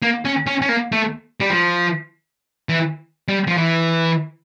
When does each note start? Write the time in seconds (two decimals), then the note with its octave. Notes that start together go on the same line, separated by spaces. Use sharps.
0.02 A#3
0.25 C#4
0.47 C#4
0.62 C#4
0.69 A#3
0.92 A3
1.40 G3
1.50 F3
2.69 E3
3.28 G3
3.47 F3
3.57 E3